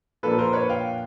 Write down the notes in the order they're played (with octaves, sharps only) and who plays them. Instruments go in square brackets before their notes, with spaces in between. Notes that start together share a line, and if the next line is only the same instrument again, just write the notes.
[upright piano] A#2 F3 A#3 D4 A4 B4
A#4 C5
B4 C#5
F5 G5